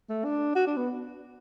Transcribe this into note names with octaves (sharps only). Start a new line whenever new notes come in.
A3
D4
F#4
D4
B3